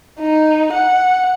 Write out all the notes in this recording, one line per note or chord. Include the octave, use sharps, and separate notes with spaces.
D#4
F#5